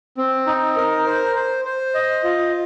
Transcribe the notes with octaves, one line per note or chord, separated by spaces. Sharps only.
C4
D#4
A#4
C5
C5
C5
D#5
F4